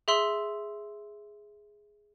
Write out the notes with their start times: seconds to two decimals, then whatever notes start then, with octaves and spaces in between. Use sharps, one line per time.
0.08 G#4 E5 C6 E6 F#7